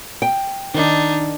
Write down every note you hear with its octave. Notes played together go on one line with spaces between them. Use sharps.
G5
D#3 D4 D#4